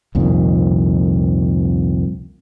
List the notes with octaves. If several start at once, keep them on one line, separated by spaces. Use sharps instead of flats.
C2 F2 A#2 D#3